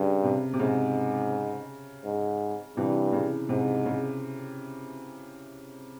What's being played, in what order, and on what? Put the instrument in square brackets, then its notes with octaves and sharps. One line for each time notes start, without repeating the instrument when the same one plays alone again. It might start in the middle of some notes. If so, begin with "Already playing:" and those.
Already playing: [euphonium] G2 [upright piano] C#3
[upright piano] C3
C3
[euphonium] G#2 [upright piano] C#3
[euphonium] G#2
[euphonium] G2 [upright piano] C3 E3
[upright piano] C#3
[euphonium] G#2 [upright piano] C3
[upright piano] C#3